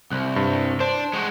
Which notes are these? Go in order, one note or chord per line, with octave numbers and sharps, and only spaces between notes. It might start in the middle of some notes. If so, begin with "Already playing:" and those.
C2 F#6
G2
D4 C5
G#3 F#4